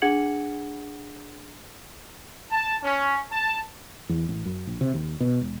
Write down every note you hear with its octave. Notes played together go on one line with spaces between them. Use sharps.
D4 G#4 F#5 G#6 C#7 F#7
A5
C#4
A5
E2
A1
F#2
A#1
C3
D#2
B2
E1